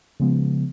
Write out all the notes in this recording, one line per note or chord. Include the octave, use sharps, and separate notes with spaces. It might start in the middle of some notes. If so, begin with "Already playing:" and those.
C#3 F3 G#3 B3